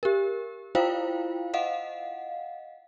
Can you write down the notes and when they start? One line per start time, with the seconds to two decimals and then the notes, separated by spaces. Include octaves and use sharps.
0.03 G4 A#4
0.75 E4 F4 C5 F5 G5
1.54 D#5 F5 F#5